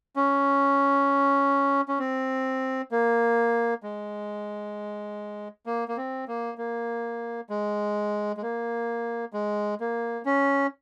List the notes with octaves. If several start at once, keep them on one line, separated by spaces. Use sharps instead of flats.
C#4
C#4
C4
A#3
G#3
A#3
A#3
C4
A#3
A#3
G#3
G#3
A#3
G#3
A#3
C#4